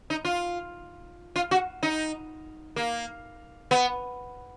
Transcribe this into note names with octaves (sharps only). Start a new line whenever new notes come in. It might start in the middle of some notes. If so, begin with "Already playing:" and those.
D#4
F4
F4
F#4
D#4
A#3
B3